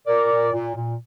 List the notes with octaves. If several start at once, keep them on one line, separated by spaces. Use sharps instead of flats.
A#2 A#4 D5
A#2
A#2
A#2